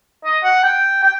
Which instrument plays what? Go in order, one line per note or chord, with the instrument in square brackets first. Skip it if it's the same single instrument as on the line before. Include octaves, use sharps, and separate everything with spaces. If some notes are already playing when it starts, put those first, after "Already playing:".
[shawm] D#5
F#5
G5
G5